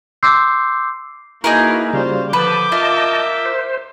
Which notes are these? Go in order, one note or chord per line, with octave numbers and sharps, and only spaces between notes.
C6 D6 E6 G6 C7
A#3 D#4 E4 F#4 G#4 A#4 B4
C#3 G3 F4 F#4 C5 F5
D3 D#3 F3 B4 A5 D6 G6
F4 A#4 D#5 E5 A5
C5